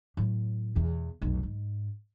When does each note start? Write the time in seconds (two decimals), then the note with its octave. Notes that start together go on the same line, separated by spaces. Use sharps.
0.17 A2 F#3
0.75 E2 B2
1.21 F1 B1
1.43 G#2